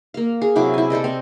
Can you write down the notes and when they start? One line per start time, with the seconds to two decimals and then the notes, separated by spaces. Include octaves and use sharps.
0.14 A#3 F5
0.42 G#4
0.56 C3 F#3 E4 D6
0.74 E4 G#5
0.90 A4 C5 D5 D#5
1.04 C4